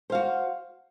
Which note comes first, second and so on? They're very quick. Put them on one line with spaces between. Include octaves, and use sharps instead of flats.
C5 F5 F#4